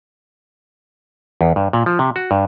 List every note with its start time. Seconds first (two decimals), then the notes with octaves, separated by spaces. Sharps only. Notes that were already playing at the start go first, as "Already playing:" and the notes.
1.41 E2
1.56 G2
1.73 A#2
1.86 F3
1.99 C3
2.16 F#4
2.31 G2